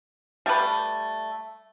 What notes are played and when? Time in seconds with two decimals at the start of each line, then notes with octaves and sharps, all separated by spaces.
0.46 G3 A3 G4 B4